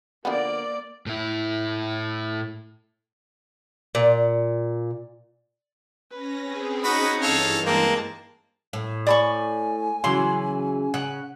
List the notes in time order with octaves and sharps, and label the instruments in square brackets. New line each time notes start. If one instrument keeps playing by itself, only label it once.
[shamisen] D3 F3 B3 [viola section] A#3 D5
[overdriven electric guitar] A2 E4
[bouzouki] A#2
[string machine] C#4 A#6 [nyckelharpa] B4
[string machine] C4 C#4 G#4
[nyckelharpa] D#4 F#5 [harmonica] F#4 D#5 B5
[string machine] G2 E3 [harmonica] A4 C#5 F5
[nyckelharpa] G#3 A5 [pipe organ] A#3 [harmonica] C4
[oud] A2
[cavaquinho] D5 B5 C#6 [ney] G#5
[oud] C#3 E3 F#3 [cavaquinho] C6
[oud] C#3 [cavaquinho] F#5